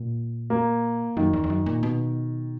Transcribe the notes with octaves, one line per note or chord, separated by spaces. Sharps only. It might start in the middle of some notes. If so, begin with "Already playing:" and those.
Already playing: A#2
A#3
F#2 D#3
E2
E2
F#2
A#2
B2